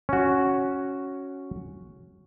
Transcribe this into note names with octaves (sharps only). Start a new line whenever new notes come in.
C#4 F#4